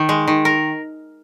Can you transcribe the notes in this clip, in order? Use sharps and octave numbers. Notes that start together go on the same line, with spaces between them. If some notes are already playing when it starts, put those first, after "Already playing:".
Already playing: D#3
G#3
D#3
A#4